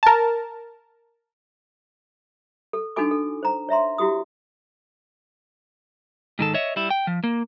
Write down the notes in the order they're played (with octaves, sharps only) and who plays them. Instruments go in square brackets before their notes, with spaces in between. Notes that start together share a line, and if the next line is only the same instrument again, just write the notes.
[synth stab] A#4 A5
[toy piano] A4
D4 D#4 F#4 A4 G#5 D6
A4
C5 A#5
C#5 E5 A#5 C6
E4 F#4 G4 D#6
[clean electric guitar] G#2 D#3 A4
C#5 D#5 E5
G3 E4
G5
F3
A#3